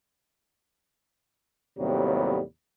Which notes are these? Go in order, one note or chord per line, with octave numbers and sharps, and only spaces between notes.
D#2 A2 C3 F#3 G3 B3